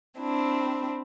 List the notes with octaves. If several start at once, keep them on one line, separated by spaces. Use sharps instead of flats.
C4 D4 E4